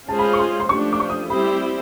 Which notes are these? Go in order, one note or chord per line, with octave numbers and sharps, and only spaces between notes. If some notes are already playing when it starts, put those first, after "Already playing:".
G#3 C#4 F4 G#4 C5 A5
B5
C#6
C6
C6
F3 A3 D4 G4 C#6
D6
C#6
D#6
G3 C4 E4 G4 C5 B5